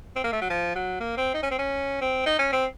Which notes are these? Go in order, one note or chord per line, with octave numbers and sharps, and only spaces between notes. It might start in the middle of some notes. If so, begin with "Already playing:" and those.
C4
A#3
A3
F#3
F3
F#3
A#3
C4
D#4
C#4
C4
C#4
C4
D#4
C#4
C4